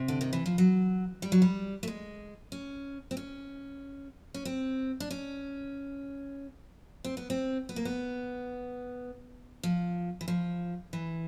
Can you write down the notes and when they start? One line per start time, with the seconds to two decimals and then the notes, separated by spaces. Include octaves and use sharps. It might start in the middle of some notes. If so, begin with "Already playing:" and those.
Already playing: C3
0.08 D3
0.21 D#3
0.33 E3
0.46 F3
0.58 F#3
1.22 G3
1.32 F#3
1.42 G3
1.83 A3
1.88 G#3
2.52 C#4
3.11 C4
3.17 C#4
4.34 C#4
4.45 C4
5.00 D4
5.11 C#4
7.04 C4
7.17 B3
7.30 C4
7.69 B3
7.76 A#3
7.85 B3
9.63 F3
10.21 E3
10.28 F3
10.93 E3